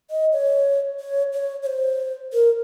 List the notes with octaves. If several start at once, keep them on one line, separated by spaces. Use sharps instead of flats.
D#5
C#5
C#5
C#5
C#5
C5
A#4